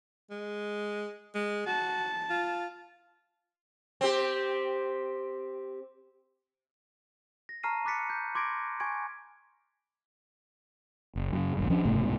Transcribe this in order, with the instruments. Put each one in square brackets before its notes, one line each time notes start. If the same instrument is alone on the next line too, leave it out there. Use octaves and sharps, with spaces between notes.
[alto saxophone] G#3
G#3
[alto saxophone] F#4 [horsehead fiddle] A5
[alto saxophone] F4
[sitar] C4 G4
[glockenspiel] A#6
A5 A#5 C#6 F6 C7 D#7
B5 D6 F#6 A6 B6 C#7
G6
C6 D6 G#6 A#6 D7
G#5 C#6 G#6 D7
[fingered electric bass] F#1
F#2 C#3
E1 A1 G2
F3 C#4 D4
F#1 G#2 C3 A3
C2 G#2 B2